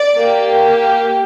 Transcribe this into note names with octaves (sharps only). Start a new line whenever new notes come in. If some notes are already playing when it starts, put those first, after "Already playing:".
Already playing: D5
A#3 G4